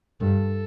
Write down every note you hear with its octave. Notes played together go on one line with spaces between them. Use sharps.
G2 A4